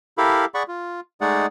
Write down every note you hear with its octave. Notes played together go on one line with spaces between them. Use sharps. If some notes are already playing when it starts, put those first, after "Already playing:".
E4 G4 A4 A#4 F5 B5
G#4 D5 F#5 B5 C#6
F4
G#3 A3 D#4 G#4 D5 F#5